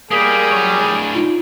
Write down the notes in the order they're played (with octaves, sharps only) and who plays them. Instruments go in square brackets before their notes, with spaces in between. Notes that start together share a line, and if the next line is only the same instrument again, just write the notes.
[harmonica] G3 G#4 [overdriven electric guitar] A#3 [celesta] D#6 B6
[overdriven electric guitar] F#4 C#5
A2 D4
[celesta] D#4 F4